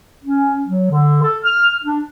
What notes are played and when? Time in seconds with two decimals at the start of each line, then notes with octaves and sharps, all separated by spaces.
0.24 C#4
0.66 F#3
0.90 D3
1.22 A4
1.44 F6
1.84 D4